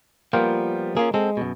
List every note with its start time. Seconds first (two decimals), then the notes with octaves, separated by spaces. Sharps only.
0.33 F3 G3 A#3 B3 F4 G5
0.97 A#3 C#4 F4 G#4
1.14 G#3 C4 A4
1.37 F#2 B2